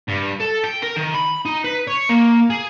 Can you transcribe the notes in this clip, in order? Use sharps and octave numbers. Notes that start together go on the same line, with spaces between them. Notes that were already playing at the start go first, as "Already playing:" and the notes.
G2
A4
G5
A#4
D#3
B5
D#4
B4
C#5
A#3
G#4